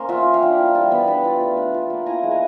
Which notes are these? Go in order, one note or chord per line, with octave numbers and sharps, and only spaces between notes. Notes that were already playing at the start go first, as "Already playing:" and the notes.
Already playing: A#3 C#4 A#4 C5
F4 E5 F#5
A#3
F5 G5
D4
E4
G3 G5 A5
B3 A5 B5
D4 A5 B5
F4
A3
D4
F4
A#3
E4 G#5 A#5
G#3
G#5 A#5